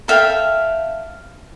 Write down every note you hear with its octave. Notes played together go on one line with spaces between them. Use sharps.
A4 E5 F5 G5